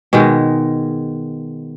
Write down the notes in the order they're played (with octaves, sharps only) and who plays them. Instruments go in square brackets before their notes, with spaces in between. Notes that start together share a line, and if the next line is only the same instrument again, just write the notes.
[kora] B2 D#3 G#3